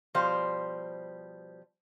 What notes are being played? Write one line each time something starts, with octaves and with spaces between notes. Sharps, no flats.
B2 F3 G3 C5 F5